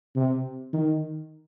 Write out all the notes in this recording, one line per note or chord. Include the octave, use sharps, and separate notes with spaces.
C3
D#3